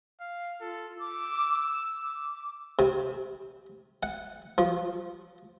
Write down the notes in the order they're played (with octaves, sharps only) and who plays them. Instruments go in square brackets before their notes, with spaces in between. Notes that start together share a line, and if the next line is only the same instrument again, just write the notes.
[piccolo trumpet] F5
[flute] F4 [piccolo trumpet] A4
[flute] D6 [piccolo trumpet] E6
[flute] D6
[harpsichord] C3
F#5
F3